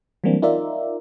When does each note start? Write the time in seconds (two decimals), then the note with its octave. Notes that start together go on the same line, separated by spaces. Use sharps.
0.24 E3 F#3 G3 A#3 C4 D4
0.42 D#4 F4 A#4 D5 E5